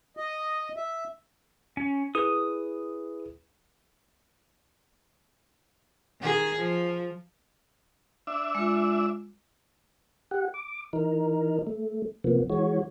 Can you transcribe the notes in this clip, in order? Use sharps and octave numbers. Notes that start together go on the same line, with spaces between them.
D#5
E5
C#4
E4 G#4 B4 D#6
D#3 G#4
F3
D4 E5
G#3 F4
G4 F#5
D6
E3 D#4 A#4
A3
C3 F3 A#3 B3
E3 G#3 F#4 C#5